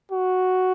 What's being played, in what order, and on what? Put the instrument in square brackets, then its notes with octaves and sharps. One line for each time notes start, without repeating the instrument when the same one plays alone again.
[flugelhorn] F#4